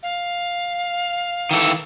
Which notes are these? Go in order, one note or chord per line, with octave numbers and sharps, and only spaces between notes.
F5
D#3 E3 A4